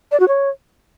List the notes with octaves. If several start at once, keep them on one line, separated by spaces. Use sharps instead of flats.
D5
F#4
C#5